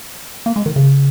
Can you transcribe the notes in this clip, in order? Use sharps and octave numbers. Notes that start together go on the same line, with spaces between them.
A#3
G#3
D#3
C#3